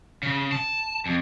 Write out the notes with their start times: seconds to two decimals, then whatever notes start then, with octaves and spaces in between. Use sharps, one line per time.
0.23 C#3
0.52 A5
1.06 F2